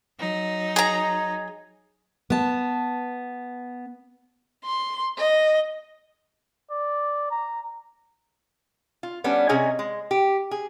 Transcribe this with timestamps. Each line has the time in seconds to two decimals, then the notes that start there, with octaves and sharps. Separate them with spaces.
0.19 F#3 D#4
0.76 G#4 A#5
2.30 B3 A5
4.65 C6
5.18 D#5
6.70 D5
7.31 A#5
9.03 F4
9.24 G3 B3 C#4 D4
9.49 C3 C#4 G#4 C#5 D#5 G#5
9.79 G#3
10.11 G4
10.51 G#4